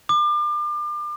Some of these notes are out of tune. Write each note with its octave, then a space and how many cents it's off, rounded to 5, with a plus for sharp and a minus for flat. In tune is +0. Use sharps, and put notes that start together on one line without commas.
D6 +35